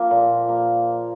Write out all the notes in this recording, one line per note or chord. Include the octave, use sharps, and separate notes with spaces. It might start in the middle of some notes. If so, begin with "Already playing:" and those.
Already playing: F3 A#3
A#2
A#3